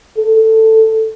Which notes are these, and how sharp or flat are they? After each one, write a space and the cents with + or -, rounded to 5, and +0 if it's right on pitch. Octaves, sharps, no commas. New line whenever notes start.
A4 +10